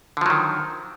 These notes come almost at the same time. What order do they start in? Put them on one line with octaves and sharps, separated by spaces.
D3 F3 F#3 D#3